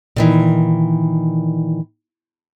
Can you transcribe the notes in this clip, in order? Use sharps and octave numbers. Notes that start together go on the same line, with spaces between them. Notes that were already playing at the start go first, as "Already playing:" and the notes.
A#2 D#3 E3